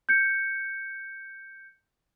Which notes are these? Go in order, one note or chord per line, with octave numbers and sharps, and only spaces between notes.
G6 C#7